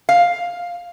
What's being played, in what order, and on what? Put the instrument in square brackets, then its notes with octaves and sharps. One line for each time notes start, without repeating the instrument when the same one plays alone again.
[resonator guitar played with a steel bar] F5